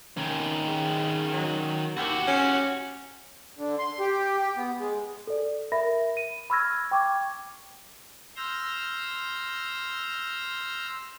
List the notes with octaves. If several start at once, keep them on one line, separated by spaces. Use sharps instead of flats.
D#3 C#4
C#3
F#3
D#2 F#4 G4
C#4
D3
C6
G4
G4
B3
G#3
A4 D5
A#4 E5 B5 A#6
D#7
B5 C#6 E6 F6 G#6 A#6
G5 C#6 D6 G#6
C6 E6 F6 G6 A#6